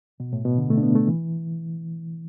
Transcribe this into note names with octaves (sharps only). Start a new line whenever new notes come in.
B2
A2
B2
D3
A3
D4
B3
A3
E3